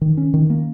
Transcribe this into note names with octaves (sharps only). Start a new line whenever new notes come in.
D#3
C#4
D#3
A#3